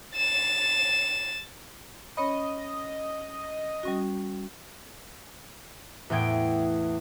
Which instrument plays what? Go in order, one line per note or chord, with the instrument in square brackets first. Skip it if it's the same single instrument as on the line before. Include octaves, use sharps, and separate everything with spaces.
[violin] A6 E7
[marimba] C#4 C#5 B5 [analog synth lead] D#5
[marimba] G3 C#4 F#4
[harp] E2 A2 G5 G#6 D7